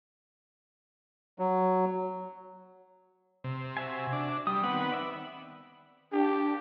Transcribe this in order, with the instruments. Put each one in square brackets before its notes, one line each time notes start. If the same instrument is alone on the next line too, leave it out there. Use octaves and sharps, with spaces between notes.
[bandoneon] F#3
[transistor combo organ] C3
[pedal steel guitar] F#4 E5 G#5
[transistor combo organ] D4
[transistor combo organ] G3 [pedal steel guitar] D#6
[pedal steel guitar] D#3 C4 [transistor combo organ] B3 F#5
[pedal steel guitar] D5 E5 B5
[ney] D4 [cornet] G4